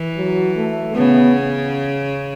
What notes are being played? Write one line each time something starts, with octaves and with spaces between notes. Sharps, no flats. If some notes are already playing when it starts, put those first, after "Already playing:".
Already playing: E3
F#3
A3
C#3 B3